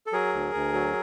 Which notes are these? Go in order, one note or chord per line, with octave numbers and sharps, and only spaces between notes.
A4
F#3 G#4 A#4
D2
D2
F#3